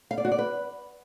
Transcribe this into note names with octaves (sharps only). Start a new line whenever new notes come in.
F5
D5
F#4
D5
B4